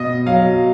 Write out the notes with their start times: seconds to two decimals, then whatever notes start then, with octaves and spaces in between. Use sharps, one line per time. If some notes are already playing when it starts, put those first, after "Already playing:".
Already playing: B2 D#5
0.26 F#3 F5